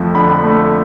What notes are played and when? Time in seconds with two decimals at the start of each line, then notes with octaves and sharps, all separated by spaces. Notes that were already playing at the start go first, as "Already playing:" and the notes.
Already playing: F2 F3 A3
0.15 D3 B5
0.43 A3